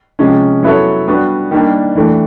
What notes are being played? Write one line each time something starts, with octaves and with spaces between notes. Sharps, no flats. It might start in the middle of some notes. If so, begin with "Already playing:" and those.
C3 F3 G#3 C#4
F#3 B3 E4 A4 C#5
G3 B3 D4 F#4
D#3 G3 A#3 D4
E3 A3 D4 G4